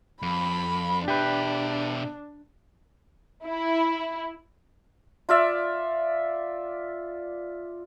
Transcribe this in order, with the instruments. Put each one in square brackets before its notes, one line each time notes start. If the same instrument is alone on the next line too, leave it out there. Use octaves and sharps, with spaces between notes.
[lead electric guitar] F2 [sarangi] B5
[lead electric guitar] B2 E5 [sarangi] D4 [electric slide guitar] G4 B4
[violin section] E4
[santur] F4 D5 E5